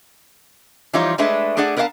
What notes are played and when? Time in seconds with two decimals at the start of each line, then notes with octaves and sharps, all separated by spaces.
0.93 E3 F3 G3 D#4 F4 C#5
1.18 G#3 A3 D4 G#4 B4 E5
1.57 A3 D4 G#4 D5 F#5
1.77 B3 A#4 C#5 D5 F5 A5